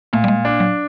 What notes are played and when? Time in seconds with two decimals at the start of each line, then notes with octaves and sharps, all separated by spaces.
0.13 A#2 A3
0.24 G3
0.28 G#3
0.45 D4
0.60 F#3